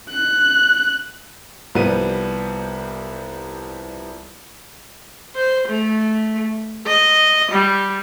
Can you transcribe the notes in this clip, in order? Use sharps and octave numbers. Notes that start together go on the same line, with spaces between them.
F#6
C2 F3 G3 B3 D#7
C5
A3
D#5
G3